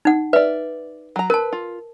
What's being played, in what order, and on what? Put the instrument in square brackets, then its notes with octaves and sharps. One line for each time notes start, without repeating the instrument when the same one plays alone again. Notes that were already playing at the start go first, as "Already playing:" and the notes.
[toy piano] D#4 F#5
[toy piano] B4 [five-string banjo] D5 E5
[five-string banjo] F#3 A#5
[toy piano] A#4 A5 [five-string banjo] B4
[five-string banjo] F4